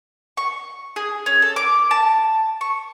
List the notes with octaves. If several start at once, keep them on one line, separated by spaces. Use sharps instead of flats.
C#6
G#4
C#4
A4
D6
A5
C#6